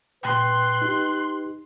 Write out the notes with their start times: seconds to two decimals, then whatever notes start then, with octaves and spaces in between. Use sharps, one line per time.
0.24 A#2 B4 G5 C6 F#6
0.82 D#4 G4